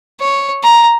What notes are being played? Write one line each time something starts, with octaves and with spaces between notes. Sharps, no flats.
C#5
A#5